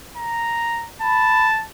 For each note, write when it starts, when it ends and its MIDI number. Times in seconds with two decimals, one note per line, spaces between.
0.17 0.88 82
1.02 1.65 81
1.02 1.48 83